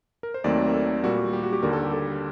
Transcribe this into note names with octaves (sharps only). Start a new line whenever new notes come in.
A#4
C5
D#2 D#3 F#3 A3 C4 D5
A#4
A4
A#2 G3 A#3 F#4
G4
F#4
G4
D#2 D3 G3 A#4
A4
G4
A4